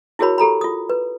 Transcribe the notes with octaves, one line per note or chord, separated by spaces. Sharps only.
E4 F#4 G#4 A#4 C#5 B5
G4 A4 A#5 B5
F4 D#6
B4